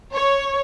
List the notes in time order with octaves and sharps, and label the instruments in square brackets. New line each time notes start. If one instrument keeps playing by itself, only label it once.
[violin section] C#5